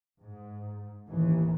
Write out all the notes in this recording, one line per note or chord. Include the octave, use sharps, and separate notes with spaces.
G#2
A1 D#2 E3